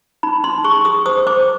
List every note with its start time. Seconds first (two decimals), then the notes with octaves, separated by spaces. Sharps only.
0.23 D#4 B5
0.44 D#4 C6
0.64 G#4 C#6
0.85 G#4 D#6
1.06 C5 D#6
1.27 C5 D6